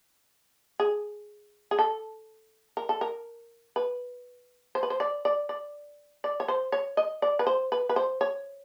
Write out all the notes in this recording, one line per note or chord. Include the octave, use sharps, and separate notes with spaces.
G#4
G#4
A4
A#4
A4
A#4
B4
C5
B4
C5
D5
D5
D5
D5
C#5
C5
C#5
D#5
D5
B4
C5
B4
B4
C5
C#5